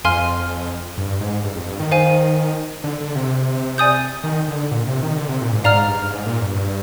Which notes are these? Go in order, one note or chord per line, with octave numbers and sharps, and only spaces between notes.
F2 F5 G#5 C6 F6
G2
G#2
G2
F2
G2
D#3
C5 F5 G#5
D3
D3
C3
D5 G#5 D#6 G6
D#3
D3
A#2
C3
D#3
D3
C3
A#2
G#2
G#2 D5 F5 A#5 F6
G2
G#2
A#2
G2